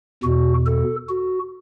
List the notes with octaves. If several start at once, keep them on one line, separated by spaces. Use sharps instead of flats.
E2 B2 F#4
A4
F#4